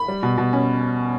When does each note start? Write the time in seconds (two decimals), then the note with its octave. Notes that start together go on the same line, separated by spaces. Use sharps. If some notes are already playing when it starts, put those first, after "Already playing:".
Already playing: B5
0.08 G3
0.23 B2
0.38 B2
0.53 C#4